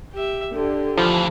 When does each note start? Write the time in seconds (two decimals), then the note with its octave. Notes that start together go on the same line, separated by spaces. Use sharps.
0.13 G4 E5
0.54 D3 G4
0.98 D2 E3 F3